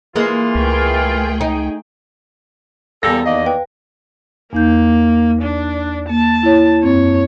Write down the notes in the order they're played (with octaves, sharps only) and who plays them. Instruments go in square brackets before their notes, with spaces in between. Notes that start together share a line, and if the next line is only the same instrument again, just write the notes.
[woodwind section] E3 F4 [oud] G#3 A#3
[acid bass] C#2 [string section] A3 G#4 G5
[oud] D#4
[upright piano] E2 A#6 [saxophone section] G3 A#3 A4
[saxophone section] D#2 D5 D#5 [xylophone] F5
[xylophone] B4 G5
[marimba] E2 D#4 G6 [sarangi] A#3
[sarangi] D4
[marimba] A#3 [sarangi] A5
[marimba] E4 C#5
[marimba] F#2 C4 [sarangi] C#5